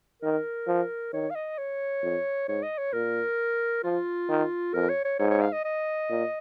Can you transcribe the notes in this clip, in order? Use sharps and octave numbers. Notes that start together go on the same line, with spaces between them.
D#3 A#4
F3
D#3 C#5
F5
D#5
C#5
F2
G#2 C#5
D#5
C#5
A#2 A#4
F3 F4
D#3
F2 A#4
C#5
C#5
G#2 C#5
C#5
F5
D#5
D#5
A#2